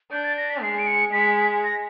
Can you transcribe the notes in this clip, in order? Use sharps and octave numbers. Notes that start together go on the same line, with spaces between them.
D4 G6
A6
A#6
B6
G#3 C7
D7
C#7
G#3 B6
A#6